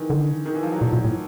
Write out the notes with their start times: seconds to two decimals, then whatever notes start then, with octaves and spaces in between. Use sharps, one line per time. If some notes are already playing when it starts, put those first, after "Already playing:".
Already playing: D#3 E3
0.10 D3
0.45 D#3
0.54 E3
0.63 F3
0.72 F#3
0.81 A#2 F3
0.93 A#2
1.05 A2